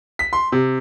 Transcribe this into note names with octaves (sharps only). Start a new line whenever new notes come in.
B6
C6
C3